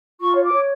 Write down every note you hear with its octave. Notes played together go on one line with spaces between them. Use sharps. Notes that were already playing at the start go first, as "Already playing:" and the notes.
F4 C#6
C#5
D6
C#5